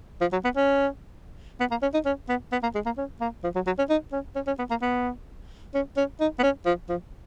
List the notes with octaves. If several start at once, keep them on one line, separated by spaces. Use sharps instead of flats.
F3
F#3
B3
C#4
B3
A#3
C#4
D#4
C#4
B3
B3
A#3
G#3
A#3
C#4
A#3
F3
F#3
F#3
C#4
D#4
C#4
C#4
C#4
B3
A#3
B3
C#4
C#4
D#4
B3
C#4
F3
F3